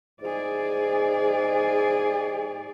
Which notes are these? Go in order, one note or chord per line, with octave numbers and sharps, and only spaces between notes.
G#2 G#4 D5